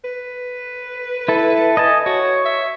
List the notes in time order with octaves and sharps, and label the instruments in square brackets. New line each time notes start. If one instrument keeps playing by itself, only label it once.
[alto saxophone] B4
[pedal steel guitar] E4 A4
D#5 G#5 A5
[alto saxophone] F#4 [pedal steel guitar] C#5
[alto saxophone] E5